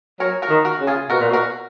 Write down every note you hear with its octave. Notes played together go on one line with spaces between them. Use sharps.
F#3 A#4 C#5
F#4 A#4
D#3
F#4 A#4
C#3
F4 G#4
B2 F#4 A#4
A#2
B2
F#4 A#4